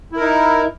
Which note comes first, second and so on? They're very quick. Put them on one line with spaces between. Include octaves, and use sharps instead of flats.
E4 A#4 D#4